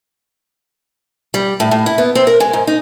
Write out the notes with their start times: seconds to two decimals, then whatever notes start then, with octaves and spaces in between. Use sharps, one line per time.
1.34 G3
1.60 A2
1.71 A2
1.86 E4
1.98 B3
2.15 C4
2.27 A#4
2.40 G#3
2.53 G#2
2.67 D#4